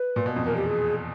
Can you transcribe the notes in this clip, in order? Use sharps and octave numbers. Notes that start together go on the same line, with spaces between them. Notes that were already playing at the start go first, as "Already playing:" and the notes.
Already playing: B4
A#2
B2
F2
E2 A#4
G4
G#4